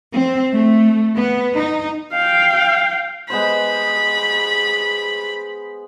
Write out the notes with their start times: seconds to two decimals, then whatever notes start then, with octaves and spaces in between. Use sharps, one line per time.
0.15 C4
0.54 A3
1.16 B3
1.54 D#4
2.13 F5 G5
3.30 G#3 B3 C5 B5